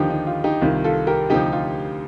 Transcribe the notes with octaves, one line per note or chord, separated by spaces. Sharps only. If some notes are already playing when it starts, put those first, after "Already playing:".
Already playing: D#2 D3 F3 D#4 G4
D#4
F4
D#4 G4
C2 C3 D#3 F4
F4 A4
G4 A#4
D2 C3 F3 D#4 G4
F4